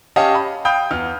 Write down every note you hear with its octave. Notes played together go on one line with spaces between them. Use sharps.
C#4 G4 D#5 F5 A5
B5
F5 G5 B5 D#6 G6
E2 F6